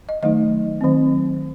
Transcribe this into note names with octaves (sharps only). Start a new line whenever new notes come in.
D#5
D#3 F#3 A3 D#4 D#5
D#3 F#3 C4